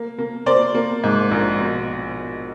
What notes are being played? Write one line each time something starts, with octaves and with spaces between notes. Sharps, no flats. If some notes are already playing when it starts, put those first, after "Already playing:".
Already playing: A#3
A#3
A#3 C5 D5
A#3
G#2
A#1
B2